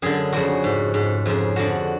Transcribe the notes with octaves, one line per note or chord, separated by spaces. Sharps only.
F#2 D3 G#4
F2 C#3 F#4
G#2
G#2
F2 C#3
F2 D3 F#4